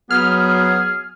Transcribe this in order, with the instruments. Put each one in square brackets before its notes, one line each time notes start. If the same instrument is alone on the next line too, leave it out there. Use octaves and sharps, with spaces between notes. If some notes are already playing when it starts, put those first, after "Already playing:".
[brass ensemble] F#3 [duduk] B3 [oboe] G#4 [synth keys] F6